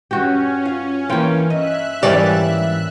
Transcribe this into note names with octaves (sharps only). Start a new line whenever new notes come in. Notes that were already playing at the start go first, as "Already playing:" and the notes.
G2 C#4 F#4 G4
F4
E3 A#3 F4 G5
D#5 E5 F#6
G#2 E3 G3 A#3 C#4 G4 D5